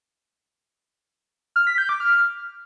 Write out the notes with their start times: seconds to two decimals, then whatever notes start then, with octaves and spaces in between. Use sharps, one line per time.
1.56 F6
1.67 B6
1.78 G6
1.89 D6
2.00 F6